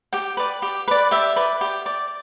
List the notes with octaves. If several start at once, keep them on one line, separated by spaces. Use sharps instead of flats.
G4 G5
B4 D5
G4
B4 D5
G4 E5
B4 D5
G4
D5